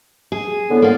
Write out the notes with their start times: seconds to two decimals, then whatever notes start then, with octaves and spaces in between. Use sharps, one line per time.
0.32 G#4
0.69 A2 D3 B3
0.82 A#3 F4